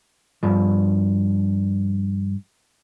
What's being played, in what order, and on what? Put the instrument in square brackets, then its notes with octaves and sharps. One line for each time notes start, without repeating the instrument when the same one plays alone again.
[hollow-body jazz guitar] G2 F3